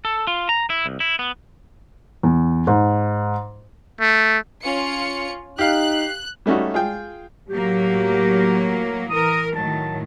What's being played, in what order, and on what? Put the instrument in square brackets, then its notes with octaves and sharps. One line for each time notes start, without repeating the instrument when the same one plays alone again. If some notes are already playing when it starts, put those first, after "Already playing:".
[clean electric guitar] A4
F4
A#5
E4
C2
E4
B3
[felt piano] E2
G#2
[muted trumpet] A3
[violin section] C#4 F4 C#7
[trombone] D#4 [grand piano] G4 F5 [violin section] F#6
[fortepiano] G3 A3 C#4 D#4 F#4
F4 G#4 G5
[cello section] A2 F#3 A#3 [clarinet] G4
[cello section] E3 A#4 [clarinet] D#6
[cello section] A2 D#3 F#3 [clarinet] A5